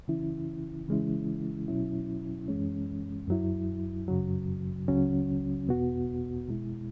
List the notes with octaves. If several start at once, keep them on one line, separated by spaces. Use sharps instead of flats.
C#3 E3 C#4 E4
C#3 E3 G#3 C#4 E4
B2 F#3 C#4 E4
F#2 E3 G#3 C#4
F#2 F#3 E4
F#2 C#3 F#3
C#2 C#3 F#3 C#4 F#4
E2 B2 B3 F#4
B2 G#3 E4